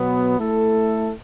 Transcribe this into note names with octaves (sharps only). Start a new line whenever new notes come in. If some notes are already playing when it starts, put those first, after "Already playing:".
Already playing: B2 F#3 B3
A3 E4 A4